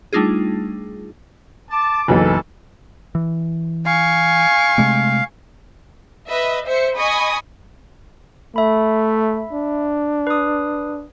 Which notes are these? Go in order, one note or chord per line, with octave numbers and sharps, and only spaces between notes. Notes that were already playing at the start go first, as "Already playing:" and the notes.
G3 A3 D4 D#4 F4 G#4
A5 D6
F#1 B1 E3 A4
E3
F5 G#5 C#6
C3 G#3 A3
B4 D#5 E5
C5 E5 C#7
D#5 G#5 B5 C#6 D#6
A3 E5 B5
D4
B4 D#6